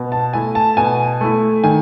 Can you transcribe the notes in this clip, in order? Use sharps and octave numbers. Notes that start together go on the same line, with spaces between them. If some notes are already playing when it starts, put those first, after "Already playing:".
Already playing: B2
A5
A3 E4 G#5
A5
B2 G#5
A3 E4
D#3 G#5